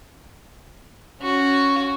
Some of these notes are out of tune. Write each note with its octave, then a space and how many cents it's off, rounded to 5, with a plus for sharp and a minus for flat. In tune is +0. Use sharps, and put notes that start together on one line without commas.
C#4 +0 F#4 +0